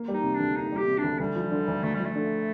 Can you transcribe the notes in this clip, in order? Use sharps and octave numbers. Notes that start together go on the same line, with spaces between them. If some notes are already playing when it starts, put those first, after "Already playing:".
Already playing: A#3
G3
D#4
C3
D4
D2
A#3 D#4
G3 G4
C3
D4
D2
D2 G3
F3
D3
D2
D2 A3
G3
F3
A3
D3